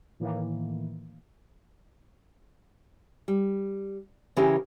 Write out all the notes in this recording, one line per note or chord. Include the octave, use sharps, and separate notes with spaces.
A2 D#3 E3 A#3
G3
C#3 E3 C#4 E4 G4 A#4